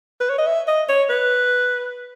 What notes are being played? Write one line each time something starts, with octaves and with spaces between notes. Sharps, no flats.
B4
C#5
D#5
E5
D#5
C#5
B4